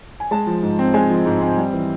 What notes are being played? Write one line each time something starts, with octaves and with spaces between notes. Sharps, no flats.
G#5
G#3 A5
F3
G#2
C4
G#3 G#5
F3
G#2
C4
G3
E3